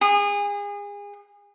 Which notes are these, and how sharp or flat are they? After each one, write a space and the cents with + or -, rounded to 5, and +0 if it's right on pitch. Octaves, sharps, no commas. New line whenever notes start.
G#4 -30